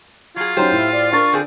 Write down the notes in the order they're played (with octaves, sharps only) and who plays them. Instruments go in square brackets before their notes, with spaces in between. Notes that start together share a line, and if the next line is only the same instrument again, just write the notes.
[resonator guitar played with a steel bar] F#3 G#4 [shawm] F4
[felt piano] F#3 C#4 D#4 [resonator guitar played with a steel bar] G4 C5
[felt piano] A2 [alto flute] E4
[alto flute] D5
[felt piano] D4 A#4 A6 [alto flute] C#6
[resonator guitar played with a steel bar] D3 C4 G#4